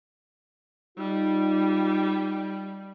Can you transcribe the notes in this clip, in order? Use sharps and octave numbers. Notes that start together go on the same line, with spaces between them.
G3 D#4 F4